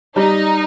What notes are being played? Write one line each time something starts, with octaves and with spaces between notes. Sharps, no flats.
G3 D#4